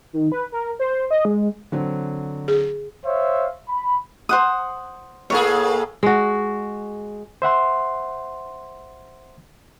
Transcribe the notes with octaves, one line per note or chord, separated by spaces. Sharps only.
D#3
B4
A#4
C5
D#5
G#3
D3 F#3 C4
G#4
C5 C#5 E5 F5
B5
C5 F#5 D#6
A2 A#3 G#4 C#5
G#3 F#4
C5 E5 F#5 C6